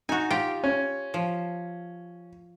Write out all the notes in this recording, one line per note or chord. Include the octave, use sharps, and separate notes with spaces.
D#4 F#4 G#5
F4 G4 G5
C#4
F3